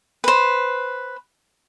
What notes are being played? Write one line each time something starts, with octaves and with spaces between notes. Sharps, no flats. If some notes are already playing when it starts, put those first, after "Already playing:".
B4 C5